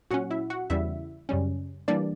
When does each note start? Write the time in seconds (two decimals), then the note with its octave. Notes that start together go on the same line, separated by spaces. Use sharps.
0.11 A#2 F#3 C#4 F#4 F#5
0.31 E4 E5
0.50 F#4 F#5
0.70 E2 C#3 E3 G3 E4 E5
1.29 F#2 C#3 G3 C#4
1.88 E3 G3 A#3 D4 D5